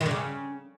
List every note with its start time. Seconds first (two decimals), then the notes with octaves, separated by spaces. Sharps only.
0.01 D#3
0.06 D3
0.11 C#3